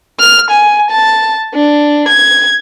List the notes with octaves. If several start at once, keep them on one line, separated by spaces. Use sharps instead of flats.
F6
G#5
A5
D4
G#6